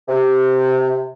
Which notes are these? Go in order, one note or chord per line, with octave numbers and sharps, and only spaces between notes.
C3